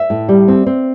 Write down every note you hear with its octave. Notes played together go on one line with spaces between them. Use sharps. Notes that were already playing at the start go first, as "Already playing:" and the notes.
Already playing: E5
A2
G3
C4
C4